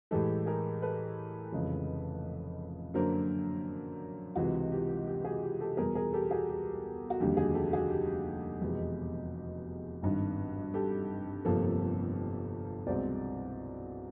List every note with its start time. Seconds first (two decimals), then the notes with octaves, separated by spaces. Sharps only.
0.11 A2 E3 G#3 G4 A4
0.46 G#4 A#4
0.82 A4 B4
1.52 F1 F2 C#3 E3 G#3
2.94 F#2 D3 F#3 A#3 D4 A#4 C5
4.35 C#2 C3 E3 G#3 F#4
4.72 G4
5.07 G4
5.25 F#4 G#4
5.43 G4
5.60 G4 A4
5.77 E2 B2 G3 G#4 A#4
5.95 G#4 A#4
6.13 G4 A4
6.31 F#4 G#4
6.49 G4
7.10 F#4
7.20 F1 D#2 D3 G3 G4
7.37 F#4 G#4
7.54 G4 A4
7.73 F#4 G#4
7.90 G4
8.61 F1 E2 B2 G#3
10.02 G#1 G2 D#3
10.74 G4 A4
11.44 G1 F2 C3 F3 A#3 G4 A4
12.86 C2 B2 G#3 C4 C5 D5